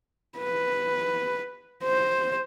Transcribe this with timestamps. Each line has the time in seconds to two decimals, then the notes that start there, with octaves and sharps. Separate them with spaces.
0.38 B4
1.84 C5